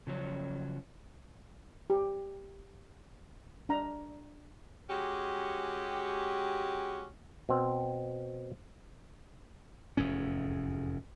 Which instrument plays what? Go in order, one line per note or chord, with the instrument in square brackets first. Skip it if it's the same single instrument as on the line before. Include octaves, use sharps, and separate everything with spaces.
[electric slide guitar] C#3 F3 F#3 C#4
[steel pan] G4
D4 A#5
[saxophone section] G#3 C#4 F#4 G4
[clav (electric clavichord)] B2 C4
[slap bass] F1 E2 G#2 C#4